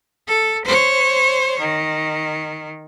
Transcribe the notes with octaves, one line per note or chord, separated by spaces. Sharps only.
A4
C5 C#5
D#3